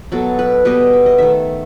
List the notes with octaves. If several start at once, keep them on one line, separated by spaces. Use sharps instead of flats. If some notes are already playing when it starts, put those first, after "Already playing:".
B2 F#3 B3 A4
B4
B2 G3 B3 D#5
E5
D#5
D#3 A3 E5